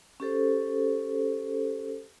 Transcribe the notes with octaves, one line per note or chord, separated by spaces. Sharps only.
C#4 G4 A4 C5